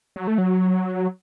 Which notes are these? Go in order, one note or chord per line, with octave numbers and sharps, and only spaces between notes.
F#3
A3
F#3